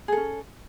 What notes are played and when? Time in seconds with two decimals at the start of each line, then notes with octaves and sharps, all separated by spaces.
0.08 G#4
0.12 A4
0.17 C#4